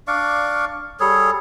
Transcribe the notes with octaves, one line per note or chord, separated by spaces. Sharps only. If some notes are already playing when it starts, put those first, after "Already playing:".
D4 D5 F5 C#6
G3 G#4 A4 C#5